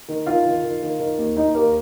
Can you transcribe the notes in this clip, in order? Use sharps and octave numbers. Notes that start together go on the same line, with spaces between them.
D#3
D#3 F4 F5
D#3
D#3
D#3
D#3
D#2
D#2 D#4 D#5
D#2 A#3 A#4